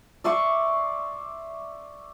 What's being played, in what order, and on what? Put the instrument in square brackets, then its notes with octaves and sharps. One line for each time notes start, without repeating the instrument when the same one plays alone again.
[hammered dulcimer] D5 E5 C6 C#6